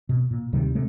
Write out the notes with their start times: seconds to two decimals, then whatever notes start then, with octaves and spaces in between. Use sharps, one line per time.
0.09 B2
0.31 A#2
0.53 D2 C3 D#3 G3
0.75 C3 G#3 A3